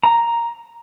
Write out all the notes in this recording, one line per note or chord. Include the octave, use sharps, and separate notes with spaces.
A#5